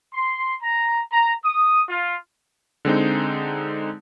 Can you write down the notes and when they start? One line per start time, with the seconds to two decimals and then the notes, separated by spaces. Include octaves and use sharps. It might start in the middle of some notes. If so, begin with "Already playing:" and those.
0.14 C6
0.62 A#5
1.12 A#5
1.43 D#6
1.88 F4
2.85 D3 G#3 C4 D#4